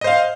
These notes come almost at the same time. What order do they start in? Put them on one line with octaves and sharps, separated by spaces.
D#5 C5 F5